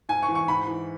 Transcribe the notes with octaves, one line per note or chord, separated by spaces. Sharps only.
G#2 G#5
C#6
E3
C#6
G#2 B5
E3